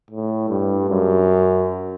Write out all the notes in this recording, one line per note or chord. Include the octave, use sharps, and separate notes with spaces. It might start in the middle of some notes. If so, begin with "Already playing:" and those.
A2
G2
F#2